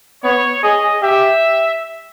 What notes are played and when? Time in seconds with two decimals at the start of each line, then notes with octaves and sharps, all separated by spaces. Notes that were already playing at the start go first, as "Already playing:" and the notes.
0.24 B3 C#5
0.63 G#4 D#5
1.03 G4 E5